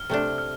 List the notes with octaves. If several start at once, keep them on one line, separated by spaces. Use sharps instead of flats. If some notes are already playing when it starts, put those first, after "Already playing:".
Already playing: F6
C3 A3 D4
F6